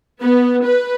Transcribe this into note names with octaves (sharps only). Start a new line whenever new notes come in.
B3
B4